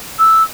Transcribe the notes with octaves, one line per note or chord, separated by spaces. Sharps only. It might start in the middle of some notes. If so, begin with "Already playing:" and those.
E6